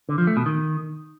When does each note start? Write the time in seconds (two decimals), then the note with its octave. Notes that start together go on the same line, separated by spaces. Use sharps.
0.09 D3
0.18 F3
0.27 A3
0.37 B2
0.46 D#3